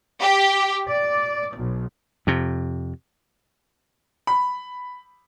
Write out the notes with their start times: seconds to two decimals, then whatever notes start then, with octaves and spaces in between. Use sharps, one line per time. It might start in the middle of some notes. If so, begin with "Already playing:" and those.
0.21 G4
0.87 D5
1.56 B1
2.27 F2 C3
4.27 B5